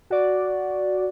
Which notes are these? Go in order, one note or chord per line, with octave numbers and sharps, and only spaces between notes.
F#4 D5